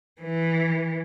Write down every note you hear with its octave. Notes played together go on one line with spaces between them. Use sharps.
E3